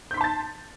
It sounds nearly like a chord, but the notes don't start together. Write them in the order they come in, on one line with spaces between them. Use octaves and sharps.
G6 B6 C6 A5 A6